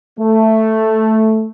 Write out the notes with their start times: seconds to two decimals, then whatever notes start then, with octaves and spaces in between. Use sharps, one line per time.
0.19 A3